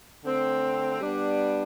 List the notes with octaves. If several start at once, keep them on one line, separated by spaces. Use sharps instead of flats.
D3 A3 C4
G3 B3 D4